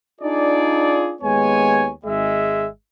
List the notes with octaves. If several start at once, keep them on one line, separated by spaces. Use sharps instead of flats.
D4 D#4 F4 G#4 D5
D#2 G#3 B3 C#5 G#5
G#1 G#3 E5